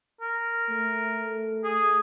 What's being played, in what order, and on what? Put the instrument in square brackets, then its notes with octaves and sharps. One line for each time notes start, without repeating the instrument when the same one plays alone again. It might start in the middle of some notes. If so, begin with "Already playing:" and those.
[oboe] A#4
[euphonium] A3
[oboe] G#4